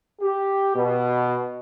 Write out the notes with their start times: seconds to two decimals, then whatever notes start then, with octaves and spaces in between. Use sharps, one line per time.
0.22 G4
0.75 B2